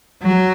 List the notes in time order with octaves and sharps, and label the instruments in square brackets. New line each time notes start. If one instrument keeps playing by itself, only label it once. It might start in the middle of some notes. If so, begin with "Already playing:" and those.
[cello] F#3